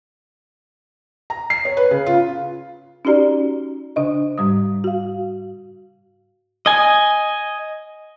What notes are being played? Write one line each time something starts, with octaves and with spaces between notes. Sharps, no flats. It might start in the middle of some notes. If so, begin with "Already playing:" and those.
A#5
C7
C#5
B4
C#3
F4
C#4 D#4 F#4 G4 D5 A#5
C#3 D4 D#5
G#2 G3 D#6
F#4 F5
D#5 G#5